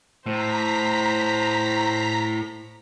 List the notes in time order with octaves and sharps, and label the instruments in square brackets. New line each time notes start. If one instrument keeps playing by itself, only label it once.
[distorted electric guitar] A2 [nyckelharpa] C5 [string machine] A#5 B6